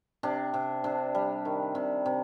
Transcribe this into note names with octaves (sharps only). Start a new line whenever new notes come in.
C3 D4
C3
C3 D4
G3
D#3
C3
C3